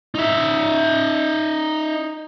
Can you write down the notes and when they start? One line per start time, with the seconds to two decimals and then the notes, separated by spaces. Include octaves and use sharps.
0.15 D#4 E5